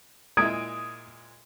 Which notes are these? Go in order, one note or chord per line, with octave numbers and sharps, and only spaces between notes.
A#2 G#3 E4 D#6 G#6 D7